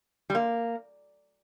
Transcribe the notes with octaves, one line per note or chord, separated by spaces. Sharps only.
G3
A#3